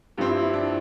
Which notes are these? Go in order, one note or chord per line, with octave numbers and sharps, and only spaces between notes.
G2 F3 C4 G4
E4
E4
D4